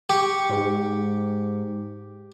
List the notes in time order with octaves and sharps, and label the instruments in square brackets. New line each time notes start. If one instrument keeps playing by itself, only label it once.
[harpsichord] G4 [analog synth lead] C#6
[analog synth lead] G#2